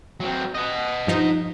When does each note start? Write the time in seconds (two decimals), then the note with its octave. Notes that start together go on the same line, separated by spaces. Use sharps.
0.20 F#3 C4
0.55 D#5 F#5
1.07 G2 F3 D#4